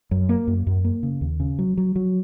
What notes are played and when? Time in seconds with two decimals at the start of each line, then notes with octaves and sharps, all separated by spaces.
0.11 F#2
0.29 A#3
0.47 F#2
0.67 F#2
0.84 A#3
1.03 C#3
1.21 D#2
1.40 C#3
1.59 F#3
1.77 F#3
1.96 F#3